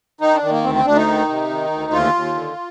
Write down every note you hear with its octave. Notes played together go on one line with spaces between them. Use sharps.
D#3 D#4
D4
D#3
A#3
D2 C4
C4
D2 D4
D#4
D#3
C3
D#3
D2
D#2 F4
D#2
D3